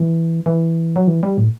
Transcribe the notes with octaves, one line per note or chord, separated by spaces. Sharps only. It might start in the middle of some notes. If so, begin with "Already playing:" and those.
Already playing: E3
E3
F#3
E3
G3
A2